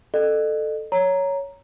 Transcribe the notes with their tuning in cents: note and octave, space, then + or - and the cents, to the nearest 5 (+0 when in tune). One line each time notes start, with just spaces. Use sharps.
A4 +0 D#5 -40
C#5 +5 A#5 +0